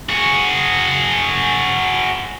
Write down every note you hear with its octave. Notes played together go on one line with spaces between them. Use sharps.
F#4 G#4